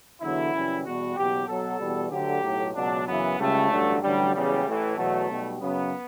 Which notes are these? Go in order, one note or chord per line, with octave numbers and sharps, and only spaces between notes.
E2 D3 F#3 E4
F#2 C#3 E3 G3
E2 B2 G3 F#4
F#1 E2 B2 F#3 G4
B1 B2 F#3 A4
E2 B2 G3
D2 D3 F#3 G4
B1 A2 F#3
C#2 B2 F#3 D4
F#2 C#3 E3 B3
C#2 C#3 G3 A3
A1 G2 D3 F#3
A1 G2 D3 F#3 G3
F#1 E2 C#3 G3
A1 A2 E3
E2 B2 F#3 A3
B1 B2 G3
F#2 C#3 F#3 B3